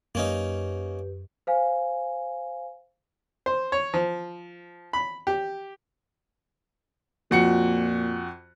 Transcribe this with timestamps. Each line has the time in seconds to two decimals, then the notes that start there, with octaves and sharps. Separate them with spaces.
0.15 F#2 A#3 C#4 D#4 G4 B4
1.47 C5 F5 G#5
3.46 C5
3.72 C#5
3.94 F3
4.93 B5
5.27 G4
7.31 F2 A#2 F#4 C#7